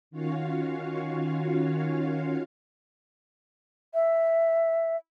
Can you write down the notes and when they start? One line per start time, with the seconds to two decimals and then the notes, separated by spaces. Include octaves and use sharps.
0.11 D#3 C#4 F4 F#4 C#5 F5
3.94 E5